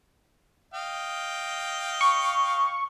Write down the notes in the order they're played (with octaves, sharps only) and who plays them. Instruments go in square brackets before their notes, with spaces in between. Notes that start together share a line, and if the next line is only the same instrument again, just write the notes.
[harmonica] D#5 F5 G5
[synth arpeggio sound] C#6